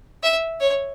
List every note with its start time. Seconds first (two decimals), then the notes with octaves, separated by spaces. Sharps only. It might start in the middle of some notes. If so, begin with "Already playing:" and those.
0.23 E5
0.60 C#5